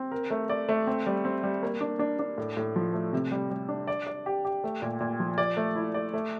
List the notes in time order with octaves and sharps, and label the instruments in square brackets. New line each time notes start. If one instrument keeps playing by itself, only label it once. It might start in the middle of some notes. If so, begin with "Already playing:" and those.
Already playing: [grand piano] C4
A#4
A3
D5
A3
C4
G3
C4
G3
A#3
D4
D4
D4
A2
A2
F3
A3
C3
G3
G3
D4
D5
D5
G4
G4
A3
A#2
A#2
F3
D5
A3
E4
D5
A3